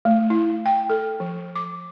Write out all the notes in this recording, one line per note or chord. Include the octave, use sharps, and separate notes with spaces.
A3
E4
G5
A4
F3
D6